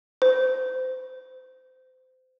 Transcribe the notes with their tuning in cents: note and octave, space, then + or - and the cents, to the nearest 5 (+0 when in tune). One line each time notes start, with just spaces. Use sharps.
C5 -30